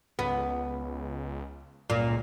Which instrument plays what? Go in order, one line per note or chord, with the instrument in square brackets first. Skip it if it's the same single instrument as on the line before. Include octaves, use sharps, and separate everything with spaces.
[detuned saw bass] C#2 [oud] B3
[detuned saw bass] C#2 [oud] A#2